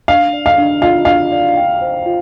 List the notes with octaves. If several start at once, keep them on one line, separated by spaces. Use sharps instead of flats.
D4 F5
D5
F5
D4
F4 F5
D4 F5
D5
G5
C5
F4